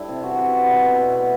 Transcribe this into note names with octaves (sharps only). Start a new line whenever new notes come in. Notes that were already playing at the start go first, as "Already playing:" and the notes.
Already playing: G3 D4 E4 A4 D5
C3
E3 F#4
C4 F#4
C3 F#5
G3 E5
B2
E5
B2
A3 F#5